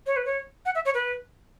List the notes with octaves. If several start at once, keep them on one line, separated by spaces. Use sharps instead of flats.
C#5
B4
C#5
F#5
E5
C#5
B4